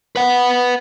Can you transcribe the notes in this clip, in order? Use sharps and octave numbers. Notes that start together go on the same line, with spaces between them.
B4 F#5